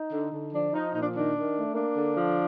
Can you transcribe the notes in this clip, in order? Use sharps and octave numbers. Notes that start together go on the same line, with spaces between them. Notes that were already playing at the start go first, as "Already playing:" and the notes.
Already playing: D#4
D3
D3
F3 D4
F3 D#4
A#2 D#4
D4
D#3 D4
D#3
A3
A#3 D4
D3
F3